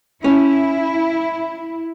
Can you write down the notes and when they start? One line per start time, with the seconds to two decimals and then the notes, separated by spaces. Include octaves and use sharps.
0.24 C#4 E4